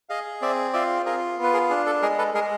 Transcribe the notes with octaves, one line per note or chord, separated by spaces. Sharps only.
G#4 D#5 F5
C4 D5 E5
F4 D5 E5
F4 G#4 A#4
B3
B4
G#4 A#4
D4 G#4
A4
G#3 G#4 A#4
A4 B4
G#3 G#4 A#4